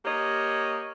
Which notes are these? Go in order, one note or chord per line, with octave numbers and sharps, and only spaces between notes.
A#3 G4 C#5 D#5